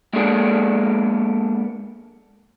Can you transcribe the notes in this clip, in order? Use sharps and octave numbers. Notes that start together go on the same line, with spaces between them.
G#3 A#3 B3 D4 G#4 A#4